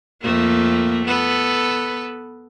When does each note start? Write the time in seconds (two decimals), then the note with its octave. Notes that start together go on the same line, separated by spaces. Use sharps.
0.21 F2 A3 A#3
1.05 B3 A4 B4